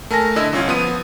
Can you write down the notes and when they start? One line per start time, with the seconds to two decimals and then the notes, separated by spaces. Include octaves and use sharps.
0.11 A3 A#4 G#5 A5 A#6
0.36 D3 E4 D#5 E6
0.53 C2 C#4 F4 G#6
0.68 F3 B3 D#6 D#7